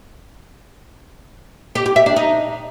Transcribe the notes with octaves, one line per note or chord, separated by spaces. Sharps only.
G4
G4
E5
D4
D#4